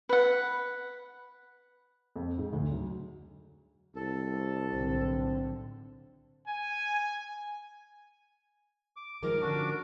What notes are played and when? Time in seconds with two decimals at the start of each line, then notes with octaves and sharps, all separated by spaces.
0.09 B4 F#5
2.16 F2
2.38 G#2
2.53 D2
2.71 F#3
3.96 C2 A4
4.69 B1 A2 D3 C4
6.48 G#5
8.96 D6
9.23 D#3 F3 G#3 A#4 D6
9.41 D3 F3 C#4 D4 F#4 D6